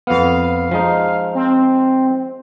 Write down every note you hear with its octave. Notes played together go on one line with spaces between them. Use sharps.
F2 B3 F5
F3 G#3 D#4
C4